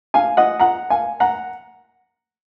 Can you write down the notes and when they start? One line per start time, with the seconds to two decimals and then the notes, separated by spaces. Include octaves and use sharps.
0.14 F5 G#5
0.37 D#5 F#5
0.60 F#5 A#5
0.90 F5 G#5
1.20 F#5 A#5